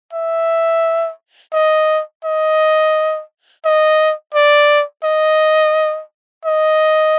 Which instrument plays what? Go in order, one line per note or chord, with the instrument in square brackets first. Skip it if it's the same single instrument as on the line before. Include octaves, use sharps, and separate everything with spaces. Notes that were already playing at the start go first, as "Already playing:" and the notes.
[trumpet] E5
D#5
D#5
D#5
D5
D#5
D#5